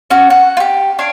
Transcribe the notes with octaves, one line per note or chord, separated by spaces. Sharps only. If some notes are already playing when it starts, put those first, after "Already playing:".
C#4 F#4
F#5
F4 G4
D4 C#5 F5